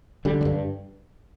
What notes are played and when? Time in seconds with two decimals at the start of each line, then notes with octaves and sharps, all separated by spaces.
0.25 D3 G3
0.41 G3
0.45 G2